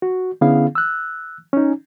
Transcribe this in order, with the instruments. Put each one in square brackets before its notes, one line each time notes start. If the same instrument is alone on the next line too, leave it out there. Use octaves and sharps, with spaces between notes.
[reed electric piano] F#4
D3 B3 C#4 E4 G#4 F5
E6 F#6
C#4 D#4